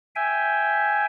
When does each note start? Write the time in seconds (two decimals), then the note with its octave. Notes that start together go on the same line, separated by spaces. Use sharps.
0.16 E5 G5 G#5